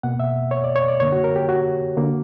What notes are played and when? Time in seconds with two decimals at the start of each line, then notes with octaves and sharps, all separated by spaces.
0.03 B2 A#3 F#5
0.20 E5
0.51 C#5
0.64 D5
0.76 C#5
0.88 D5
1.00 F#2 D3 A#3 C#5
1.12 F#4
1.24 A#4
1.36 G4
1.49 F#4
1.97 D3 A#3